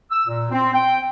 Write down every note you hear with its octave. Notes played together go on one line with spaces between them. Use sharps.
E6
A#2
C4
G5